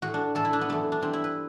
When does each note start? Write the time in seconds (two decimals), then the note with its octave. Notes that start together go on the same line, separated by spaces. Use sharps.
0.02 A2 E3 F#4
0.14 D4
0.35 A2 E3 A4
0.45 E4
0.53 D4
0.61 B3
0.69 F#2 E3 A3
0.92 D4
1.01 G2 E3 C4
1.13 E4
1.24 B4